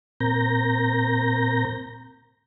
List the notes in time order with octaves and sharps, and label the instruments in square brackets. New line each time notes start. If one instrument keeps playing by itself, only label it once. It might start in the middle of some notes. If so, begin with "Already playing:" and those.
[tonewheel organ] A#2 C4 A#4 A#5 G6 A#6